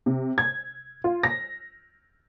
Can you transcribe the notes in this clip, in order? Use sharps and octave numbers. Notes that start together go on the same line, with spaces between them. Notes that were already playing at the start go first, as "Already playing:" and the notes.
C3
G#6
F4
A#6